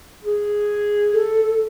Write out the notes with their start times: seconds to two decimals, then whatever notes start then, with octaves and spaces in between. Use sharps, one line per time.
0.24 G#4
1.14 A4